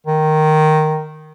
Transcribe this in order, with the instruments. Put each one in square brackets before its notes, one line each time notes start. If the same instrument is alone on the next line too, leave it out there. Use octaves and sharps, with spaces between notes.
[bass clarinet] D#3